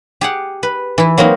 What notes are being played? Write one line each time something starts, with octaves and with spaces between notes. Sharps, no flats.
G4 G#4 F#5
B4
E3 E4
F#3 A#3 C4 D#4